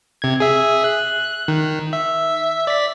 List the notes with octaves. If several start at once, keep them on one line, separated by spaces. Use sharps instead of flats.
C3 G#6
G#4 E5
F#6
D#3
E5
D5 B6